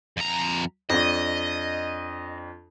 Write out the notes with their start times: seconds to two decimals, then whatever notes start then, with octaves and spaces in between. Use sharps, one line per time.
0.17 F2 A#5
0.90 F2 D4 D#5